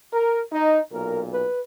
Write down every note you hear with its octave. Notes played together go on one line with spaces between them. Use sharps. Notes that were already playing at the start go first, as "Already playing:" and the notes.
A#4
D#4
B1 A#2 A#4
B4